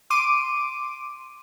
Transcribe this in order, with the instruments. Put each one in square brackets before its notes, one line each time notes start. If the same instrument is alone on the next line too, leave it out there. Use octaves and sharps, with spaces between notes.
[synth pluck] C6 D6 D7 D#7